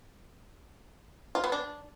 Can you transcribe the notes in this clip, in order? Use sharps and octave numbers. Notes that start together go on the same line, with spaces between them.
F4
B3
D4